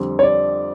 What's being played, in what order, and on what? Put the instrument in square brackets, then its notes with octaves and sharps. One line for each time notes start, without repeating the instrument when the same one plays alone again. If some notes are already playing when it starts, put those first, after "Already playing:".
Already playing: [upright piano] F2 D3 G3 C4
[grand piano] C#5
D5